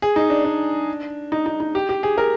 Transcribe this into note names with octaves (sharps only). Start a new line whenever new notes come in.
G#4
D#4
D4
D4
D#4
D#4
D#4
G4
G4
G#4
A#4